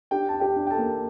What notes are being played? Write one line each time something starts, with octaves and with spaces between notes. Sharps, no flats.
D4 G4 G5
A5
D4
G4 G5
D4
G5
A4 A5
A#3